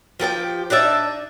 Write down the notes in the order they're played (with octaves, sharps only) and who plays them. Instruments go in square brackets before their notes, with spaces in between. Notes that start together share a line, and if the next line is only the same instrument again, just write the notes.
[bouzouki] F3 G4 A#4 G5
D4 D#4 D5 E5